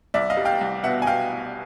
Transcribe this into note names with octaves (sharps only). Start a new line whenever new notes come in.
C2 D5 E5
D#5 F5
G3
F5 G5
C2
B2 E5 F#5
G#5
B2 F5 G5